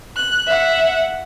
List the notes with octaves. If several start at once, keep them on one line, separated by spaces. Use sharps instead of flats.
F#6
E5 F#5